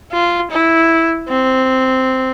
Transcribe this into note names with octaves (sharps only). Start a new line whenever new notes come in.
F4
E4
C4